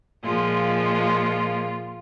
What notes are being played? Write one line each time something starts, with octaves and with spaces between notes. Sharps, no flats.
A#2 F3 G#3 F4